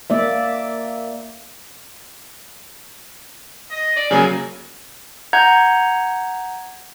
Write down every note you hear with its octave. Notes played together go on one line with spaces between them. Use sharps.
A#3 D5 E5
D#5
D5
C#3 F#3 A#3 G#5
F#5 A#5 G6 G#6